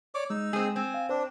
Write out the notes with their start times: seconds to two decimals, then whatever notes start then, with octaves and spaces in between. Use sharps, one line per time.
0.15 C#5 D5 D6
0.30 G#3 D#4 E6
0.53 G#3 C4 G#4
0.76 C4 G#5
0.94 F5
1.09 D4 C5